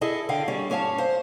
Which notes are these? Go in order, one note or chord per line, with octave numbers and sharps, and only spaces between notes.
E4 G#4 A4 D#5
D3 F5 G5
G3 C#4 C#5
G2 C#4 C#5 F5 A5
C5 F5